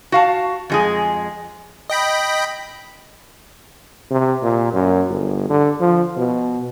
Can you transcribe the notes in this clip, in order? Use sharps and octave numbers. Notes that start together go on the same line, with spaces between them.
F#4 F5 A5
F2 G#3 G#4
D#5 G5 B5
C3
A#2
F#2
G1
D3
F3
B2